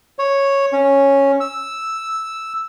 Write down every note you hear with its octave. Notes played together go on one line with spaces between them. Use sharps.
C#5
C#4
E6